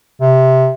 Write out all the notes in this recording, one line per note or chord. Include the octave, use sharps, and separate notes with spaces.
C3